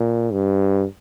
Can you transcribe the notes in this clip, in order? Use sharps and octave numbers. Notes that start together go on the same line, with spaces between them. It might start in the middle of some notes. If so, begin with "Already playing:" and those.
Already playing: A#2
G2